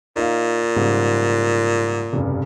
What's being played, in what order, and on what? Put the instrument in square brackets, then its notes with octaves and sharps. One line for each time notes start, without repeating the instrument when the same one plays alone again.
[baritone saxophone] A#2 [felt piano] D#4 F5
[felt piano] G#2 C#3 G3
F1 G2 C#3